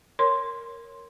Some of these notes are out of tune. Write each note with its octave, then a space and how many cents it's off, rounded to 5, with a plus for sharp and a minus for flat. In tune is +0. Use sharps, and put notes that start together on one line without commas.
A#4 +0 C#5 +0 C6 +0